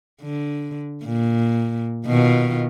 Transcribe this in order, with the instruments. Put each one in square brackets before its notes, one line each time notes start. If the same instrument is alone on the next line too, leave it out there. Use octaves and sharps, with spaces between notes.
[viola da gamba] D3
A#2
B2 D#3 F4